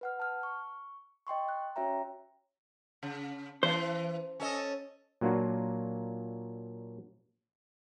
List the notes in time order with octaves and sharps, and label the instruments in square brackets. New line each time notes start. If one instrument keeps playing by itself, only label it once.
[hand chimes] B4 F#5 F6
A5 F6
C#6
D#5 G5 C6 C#6
F#6
C#4 F#4 C#5 E5 G5 A#5
[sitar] C#3
[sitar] E3 [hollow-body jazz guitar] C5
[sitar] C#4 A4 D#5
[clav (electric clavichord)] A#2 F#3 A#3 D4 F4 F#4